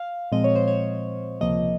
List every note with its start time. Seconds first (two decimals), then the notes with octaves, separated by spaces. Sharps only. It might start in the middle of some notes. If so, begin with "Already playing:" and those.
Already playing: F5
0.32 A#2 F3 G#3 C4 D#5
0.44 C#5
0.55 C5
0.68 C#5
1.41 C#2 C3 F3 A#3 D#5